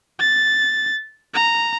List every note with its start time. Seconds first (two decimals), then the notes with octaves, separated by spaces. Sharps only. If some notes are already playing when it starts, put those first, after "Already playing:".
0.20 A6
1.34 A#5